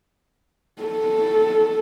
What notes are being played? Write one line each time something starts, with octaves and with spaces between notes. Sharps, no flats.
A4